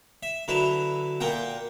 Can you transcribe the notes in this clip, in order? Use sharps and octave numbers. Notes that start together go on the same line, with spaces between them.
E5
D3 F#3 E4 B4
A#2 A#3 F#5 G5